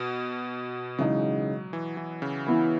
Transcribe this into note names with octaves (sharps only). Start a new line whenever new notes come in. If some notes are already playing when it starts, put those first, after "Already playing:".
Already playing: B2
C#3 E3 F#3 G#3 D#4
E3
E3
C#3
E3 B3 E4